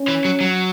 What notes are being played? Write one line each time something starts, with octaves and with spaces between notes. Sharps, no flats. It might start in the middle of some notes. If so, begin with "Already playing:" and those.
Already playing: C#4
E3
F#3
F#3